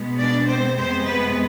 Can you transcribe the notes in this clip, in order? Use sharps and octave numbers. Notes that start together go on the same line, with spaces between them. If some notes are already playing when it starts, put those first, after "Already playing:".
Already playing: B2 G#3 B3
D4 D5
C4 C5
F2 C3 G#3 B3 C4 C5
B3 B4